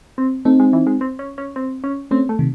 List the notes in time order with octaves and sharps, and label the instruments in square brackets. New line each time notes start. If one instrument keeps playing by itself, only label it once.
[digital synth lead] C4
[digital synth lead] A3 [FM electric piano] C4 D#4
[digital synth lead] G#3
E3
G#3
C4
C#4
C#4
C4
C#4
[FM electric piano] A3 C#4 [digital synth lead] C4
[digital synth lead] A3
[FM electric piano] C3 D#3